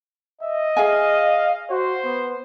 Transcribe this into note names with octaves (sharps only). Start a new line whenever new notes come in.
D#5 E5
G#4 E5 F5 G#5
F#4 C5
B3